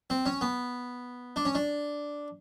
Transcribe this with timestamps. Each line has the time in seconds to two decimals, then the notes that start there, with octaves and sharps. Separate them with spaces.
0.10 C4
0.26 C#4
0.41 B3
1.36 D4
1.45 C#4
1.55 D4